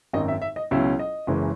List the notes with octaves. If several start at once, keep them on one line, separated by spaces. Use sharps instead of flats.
G#1 F#2 D#3 D#5
E5
E5
D#5
C#2 B2 F#3 C#4 E4 E5
D#5
F#1 F#2 E3 G#3